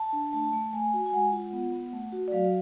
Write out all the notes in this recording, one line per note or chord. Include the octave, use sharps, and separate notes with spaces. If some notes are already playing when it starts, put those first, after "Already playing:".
Already playing: A5
D4
A3 A5
A3
A3 G#5
F#4
G#5
G#3 F#5
F4
B3
B3
A3
F#4
D5
F#3 F5